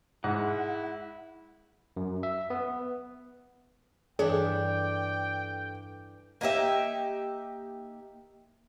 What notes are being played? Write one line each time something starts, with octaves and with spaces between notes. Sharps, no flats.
G#2 E4 F#5
F#2
E5
B3
G2 E3 D4 G#4 A4 C#5 G5
A#3 D#4 G4 E5